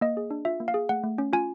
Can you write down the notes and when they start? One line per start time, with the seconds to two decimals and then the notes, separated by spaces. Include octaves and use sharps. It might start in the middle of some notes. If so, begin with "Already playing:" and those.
0.01 A#3 D#5
0.17 G#4
0.30 D4
0.45 F4 E5
0.60 A#3
0.68 F5
0.74 G#4
0.89 A3 F#5
1.04 A3
1.18 C#4
1.33 F4 G#5